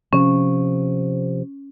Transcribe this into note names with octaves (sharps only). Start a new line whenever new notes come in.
C3 F3 C#4